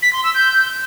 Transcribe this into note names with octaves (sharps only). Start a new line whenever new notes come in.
B6
C6
E6
G6